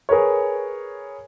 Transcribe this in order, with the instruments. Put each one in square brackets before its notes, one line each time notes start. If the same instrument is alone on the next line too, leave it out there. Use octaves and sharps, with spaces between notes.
[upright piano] G#4 A#4 B4 C#5